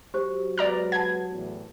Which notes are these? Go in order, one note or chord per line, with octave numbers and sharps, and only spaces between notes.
F#3 G4 C5
G#3 B3 B4 D5 A#5 F6
F#5 A5 G#6
E2 A2